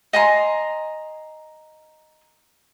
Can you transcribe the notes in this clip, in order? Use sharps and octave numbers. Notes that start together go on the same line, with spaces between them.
D#5 G#5 A#5 C6